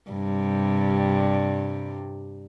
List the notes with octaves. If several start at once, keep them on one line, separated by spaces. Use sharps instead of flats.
G2 C3 G3